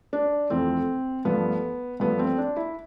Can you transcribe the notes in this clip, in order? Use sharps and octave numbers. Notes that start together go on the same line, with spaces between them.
D4
F2 E3 A3 C4
G2 F3 A3 B3
G2 F3 A3 B3
C4
D4
E4